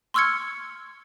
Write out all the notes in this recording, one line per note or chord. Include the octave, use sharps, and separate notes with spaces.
C6 C#6 E6 F6 G#6 C#7